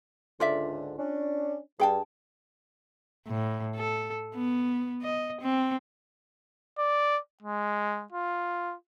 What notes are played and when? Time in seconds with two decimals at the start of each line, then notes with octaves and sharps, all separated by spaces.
0.40 C#2 G#2 D3 F4 D5 E5
0.98 C#4 D4
1.80 G2 G#4 G5 A5
3.27 A2
3.76 A4
4.34 B3
5.02 D#5
5.41 C4
6.78 D5
7.43 G#3
8.12 F4